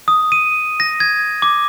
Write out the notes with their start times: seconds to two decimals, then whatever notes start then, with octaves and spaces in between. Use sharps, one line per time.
0.08 D#6
0.32 D#7
0.80 A#6
1.00 G#6
1.42 D6